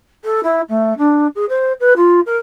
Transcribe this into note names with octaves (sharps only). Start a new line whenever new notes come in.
A4
E4
A3
D4
G#4
C5
B4
F4
A#4